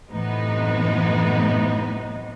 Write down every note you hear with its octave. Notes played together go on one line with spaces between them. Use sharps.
F#2 A2 C3 E3 B3 D#4